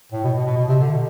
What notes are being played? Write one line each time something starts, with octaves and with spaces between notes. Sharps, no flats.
A2
B2
B2
B2
B2
C3
D3
B2